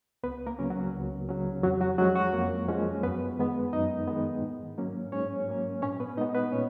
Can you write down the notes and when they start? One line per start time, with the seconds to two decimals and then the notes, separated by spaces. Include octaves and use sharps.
0.23 C#2 B3 B4
0.47 A#3 A#4
0.59 C#3 F#3 C#4
0.70 F#3 F#4
0.93 C#2
1.29 C#3 F#3 C#4
1.63 F2 F#3 F#4
1.80 F#3 F#4
1.98 F3 F#3 G#3 C#4 F#4
2.15 F#3 F#4
2.33 F2 A#3 A#4
2.68 F3 G#3 C#4
3.03 F#2 B3 B4
3.38 D#3 G#3 B3
3.73 F#2 D#4 D#5
4.07 D#3 G#3 B3
4.42 G#2
4.78 F#3 A#3 C#4
5.12 G#2 C#4 C#5
5.48 F#3 A#3 C#4
5.82 A#2 C#4 C#5
6.00 B3 B4
6.17 G#3 B3 D#4 D#5
6.35 B3 B4
6.52 A#2 C#4 C#5